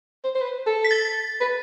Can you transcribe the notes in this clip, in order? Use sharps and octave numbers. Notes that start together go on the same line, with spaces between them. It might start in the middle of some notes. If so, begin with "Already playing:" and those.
C5
C5
B4
A4
B6
A6
B4